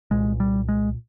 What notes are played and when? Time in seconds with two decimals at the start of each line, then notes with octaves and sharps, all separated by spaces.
0.11 C2 A#2 G#3
0.40 G3
0.69 G#3